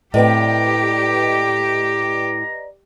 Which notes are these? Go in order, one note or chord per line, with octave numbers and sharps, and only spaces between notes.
A2 C4 G4 B4 D5 D#5 A#5